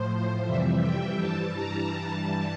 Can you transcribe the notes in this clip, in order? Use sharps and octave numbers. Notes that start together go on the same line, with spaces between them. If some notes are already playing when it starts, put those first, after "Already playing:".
Already playing: A2 F3 C5
F2 C3 E3 G3 E5
G5
G2 E3 G3 A5
A#5
G2 E3 G3 A5